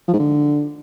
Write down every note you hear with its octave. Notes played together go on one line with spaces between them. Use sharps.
F3
G#2
D3